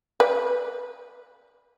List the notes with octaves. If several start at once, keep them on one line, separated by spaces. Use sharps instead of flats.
B4 D5